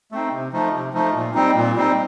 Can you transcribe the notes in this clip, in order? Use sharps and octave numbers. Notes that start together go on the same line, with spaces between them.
A3 C4 D#4
C3
F3 A3 D#4
C3
F3 A3 D#4
A#2
G3 C4 D#4
A#2
G3 C4 D#4